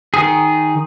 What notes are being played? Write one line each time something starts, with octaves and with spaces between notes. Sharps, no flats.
D#3 G#4